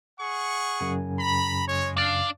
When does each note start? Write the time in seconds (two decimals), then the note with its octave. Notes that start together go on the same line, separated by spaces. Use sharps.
0.20 G#4 F#5 C#6
0.80 F#2 C#3 G#5
1.19 A#5 B5
1.67 G#3 C#5
1.97 D4 D5 F5